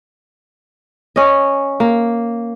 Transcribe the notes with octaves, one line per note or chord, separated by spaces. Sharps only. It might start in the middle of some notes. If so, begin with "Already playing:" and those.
C#4 D#5
A#3